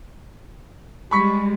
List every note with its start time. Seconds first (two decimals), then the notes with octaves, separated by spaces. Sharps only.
1.11 G3 G#3 B5 C#6 B6